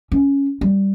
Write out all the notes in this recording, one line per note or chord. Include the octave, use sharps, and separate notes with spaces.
C#4
G3